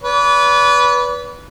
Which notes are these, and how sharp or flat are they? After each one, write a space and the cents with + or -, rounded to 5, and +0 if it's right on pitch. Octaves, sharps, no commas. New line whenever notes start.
B4 -10 D5 -40